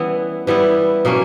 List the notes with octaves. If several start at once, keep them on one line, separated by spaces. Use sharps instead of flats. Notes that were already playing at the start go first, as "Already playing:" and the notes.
Already playing: E3 G3 B3 C#4 E4
E3 G3 B3 E4
B2 A#3 C#4